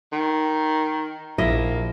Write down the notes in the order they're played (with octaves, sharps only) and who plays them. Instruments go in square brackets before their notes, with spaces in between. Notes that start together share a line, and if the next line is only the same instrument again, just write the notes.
[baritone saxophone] D#3
[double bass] A#1 [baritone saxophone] A#3 [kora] E4 D#5 E5